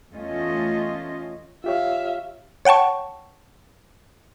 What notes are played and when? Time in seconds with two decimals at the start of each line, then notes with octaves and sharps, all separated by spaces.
0.12 E2 A3 C#4 F4 D#5
1.64 F4 G4 C#5 E5 F5
2.65 C#5 F#5 G5 A5 C#6